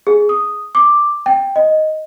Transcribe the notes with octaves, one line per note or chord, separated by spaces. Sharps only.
G#4
D#6
D6
G5
D#5